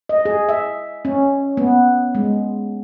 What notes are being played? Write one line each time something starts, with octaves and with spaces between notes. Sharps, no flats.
D#5
G#4
E5
C#4
B3
G#3